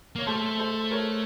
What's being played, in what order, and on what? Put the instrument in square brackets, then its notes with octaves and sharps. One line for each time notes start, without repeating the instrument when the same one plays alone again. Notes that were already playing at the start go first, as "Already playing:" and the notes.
[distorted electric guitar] A#3 [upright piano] C#5
[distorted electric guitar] A3 [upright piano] A4 C5
[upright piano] A4 C5
A#4 C#5